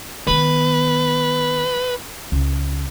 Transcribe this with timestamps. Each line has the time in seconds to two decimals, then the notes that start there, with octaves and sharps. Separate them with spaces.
0.27 D#3 B3 B4
2.32 C#2